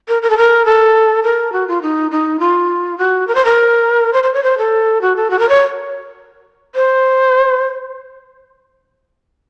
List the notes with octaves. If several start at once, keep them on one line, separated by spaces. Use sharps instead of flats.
A#4
A#4
A4
A#4
A4
A#4
F#4
F4
D#4
D#4
F4
F#4
A#4
C5
A#4
C5
C5
C#5
C5
A4
F#4
A4
F#4
A#4
C#5
C5